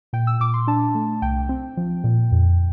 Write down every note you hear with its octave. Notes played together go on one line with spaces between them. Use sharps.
A#2 G5
E6
A#2 D6
C6
D4 A5
A3
C2 G5
C4
F3
A#2
F2